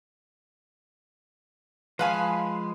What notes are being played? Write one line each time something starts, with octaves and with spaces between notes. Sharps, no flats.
F3 G#3 B4 F5 G#5